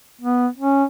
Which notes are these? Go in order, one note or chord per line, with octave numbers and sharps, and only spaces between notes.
B3
C#4